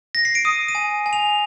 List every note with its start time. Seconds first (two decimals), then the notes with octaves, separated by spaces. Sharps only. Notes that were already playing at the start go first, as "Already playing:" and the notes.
0.15 A#6
0.25 C7
0.35 D7
0.45 D#6 D#7
0.68 D#7
0.75 G#5
1.06 G#5
1.13 F7